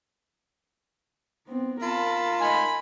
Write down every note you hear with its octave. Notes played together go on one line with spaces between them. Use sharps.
B3 C4
F4 A#4 A5 B5
D#4 G#5 B5 C6